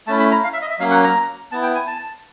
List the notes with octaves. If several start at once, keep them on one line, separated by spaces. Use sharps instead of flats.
A3 C#4 E4 A5
B5
A#5
F5
E5
D#5
E5
F#3 A#3 C#4 F5
F#5
A#5
B3 E4 A5
G5
G#5
A5